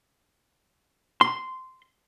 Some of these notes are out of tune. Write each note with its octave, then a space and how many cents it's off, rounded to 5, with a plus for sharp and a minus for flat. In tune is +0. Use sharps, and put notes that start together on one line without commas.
C6 -10